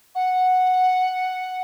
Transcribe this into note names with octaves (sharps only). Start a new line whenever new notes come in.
F#5